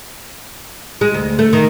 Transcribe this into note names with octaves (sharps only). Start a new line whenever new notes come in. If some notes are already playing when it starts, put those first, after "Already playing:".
G#3
D2
A3
D#3